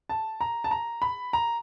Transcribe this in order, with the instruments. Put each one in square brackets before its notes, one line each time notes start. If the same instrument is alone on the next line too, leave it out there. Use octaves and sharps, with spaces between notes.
[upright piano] A5
A#5
A5
A#5
B5
A#5